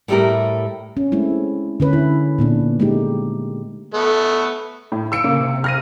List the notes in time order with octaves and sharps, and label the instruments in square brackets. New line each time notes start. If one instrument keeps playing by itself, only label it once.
[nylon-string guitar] A2 G3 A3 D#4 G4 A#4
[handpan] C#4
G#3 A3 C4 E4
D3 C#4 B4
E4
A#2 B3 D4
G#3 A3 D#4 G4
[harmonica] A3 B3
[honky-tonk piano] A2
E6 C#7 D7
[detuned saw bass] C#3 [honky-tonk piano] A#3
[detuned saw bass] C3
[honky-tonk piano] F6 A#6 D#7